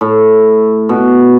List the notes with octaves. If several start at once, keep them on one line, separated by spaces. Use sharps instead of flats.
A2
B2